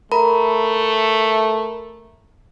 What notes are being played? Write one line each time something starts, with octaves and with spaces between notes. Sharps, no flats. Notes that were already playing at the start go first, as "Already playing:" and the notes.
A3 A#4 A#5 B5